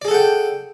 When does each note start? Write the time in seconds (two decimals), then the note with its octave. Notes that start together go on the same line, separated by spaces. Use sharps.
0.02 D5
0.05 G#4
0.08 A4
0.11 F#5
0.14 G5